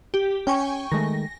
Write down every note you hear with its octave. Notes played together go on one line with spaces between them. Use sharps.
G4
C#4 G5 G#5 C#6
D#3 G#3 A3 A#6